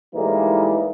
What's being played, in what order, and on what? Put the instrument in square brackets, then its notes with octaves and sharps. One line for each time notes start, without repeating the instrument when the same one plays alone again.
[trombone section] A2 E3 G3 G#3 A#3 D#4